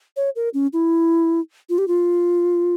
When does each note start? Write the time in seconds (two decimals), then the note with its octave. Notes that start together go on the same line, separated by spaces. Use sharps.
0.16 C#5
0.36 A#4
0.54 C#4
0.73 E4
1.69 F4
1.78 G4
1.88 F4